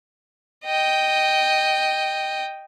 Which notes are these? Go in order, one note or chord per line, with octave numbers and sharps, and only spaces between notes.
D#5 G5